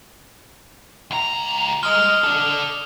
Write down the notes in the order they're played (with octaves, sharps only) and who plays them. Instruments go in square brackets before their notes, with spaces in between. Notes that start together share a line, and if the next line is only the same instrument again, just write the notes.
[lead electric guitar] C#2 A#5
[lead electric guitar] G#3 D#5 [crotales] D#6 F6
[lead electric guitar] A4 D5